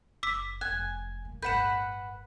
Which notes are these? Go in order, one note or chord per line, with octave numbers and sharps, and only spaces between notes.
F#1 D6 E6 B6
F1 C4 G#5 F#6
A#2 A#3
G1 A2 B4 F#5 G6 B6 E7